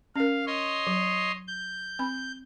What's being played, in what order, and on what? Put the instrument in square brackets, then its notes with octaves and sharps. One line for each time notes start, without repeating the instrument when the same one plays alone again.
[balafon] C#4 A#4 [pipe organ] F5
[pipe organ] C#5 D#5 C6
[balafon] F#3
[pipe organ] G6
[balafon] C4 B5